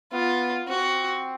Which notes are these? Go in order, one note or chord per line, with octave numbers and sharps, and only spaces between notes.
B3 F4
C4 F#4